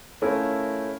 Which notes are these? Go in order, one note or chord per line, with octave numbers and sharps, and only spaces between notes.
A3 C#4 E4 F4 A#4